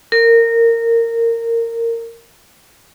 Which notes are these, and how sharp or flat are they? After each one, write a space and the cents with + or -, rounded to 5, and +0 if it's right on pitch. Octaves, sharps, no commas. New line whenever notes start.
A#4 -20